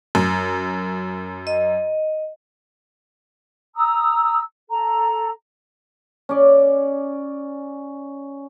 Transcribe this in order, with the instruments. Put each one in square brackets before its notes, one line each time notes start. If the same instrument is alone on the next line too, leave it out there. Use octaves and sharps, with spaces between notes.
[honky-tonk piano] F#2
[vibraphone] D#5
[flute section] A#5 D#6 E6
A4 A#5
[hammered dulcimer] C#4 D5